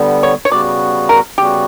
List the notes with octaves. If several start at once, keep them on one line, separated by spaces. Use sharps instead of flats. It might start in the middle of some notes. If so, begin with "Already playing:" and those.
Already playing: D3 G3 B3
C#5
C#5
C#3 G3 B3 F#4 D5
A#4
C#3 G3 B3 F#4 G4